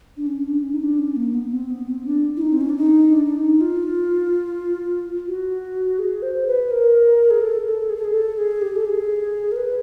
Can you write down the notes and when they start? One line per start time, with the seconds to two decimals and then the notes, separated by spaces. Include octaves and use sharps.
0.17 D4
0.27 C#4
0.45 D4
0.63 C#4
0.74 D#4
0.80 D4
0.99 C#4
1.16 A#3
1.34 B3
1.52 C4
1.70 B3
1.88 C4
2.06 D4
2.37 E4
2.41 D#4
2.53 C4
2.61 C#4
2.69 D4
2.77 D#4
3.13 D4
3.26 D4
3.37 D#4
3.61 F4
5.28 F#4
5.99 G#4
6.22 C5
6.47 B4
6.71 A#4
7.30 G#4
7.42 A4
7.66 A4
7.89 G#4
7.97 A4
8.04 G#4
8.14 A4
8.38 G#4
8.62 G4
8.76 A4
8.85 G#4
9.52 A#4
9.56 B4